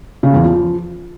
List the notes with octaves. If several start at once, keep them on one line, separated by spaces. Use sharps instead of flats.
C#3
E2
F3